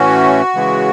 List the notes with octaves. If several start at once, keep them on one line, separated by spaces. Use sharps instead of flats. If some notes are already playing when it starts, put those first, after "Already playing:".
Already playing: A2 E3 A3 C#4 F#4
C#3 E3 G#3